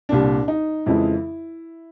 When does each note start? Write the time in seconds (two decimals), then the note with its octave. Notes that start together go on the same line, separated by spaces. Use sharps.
0.09 C2 A#2 G3 D4
0.48 D#4
0.86 F2 C#3 E3 G#3 E4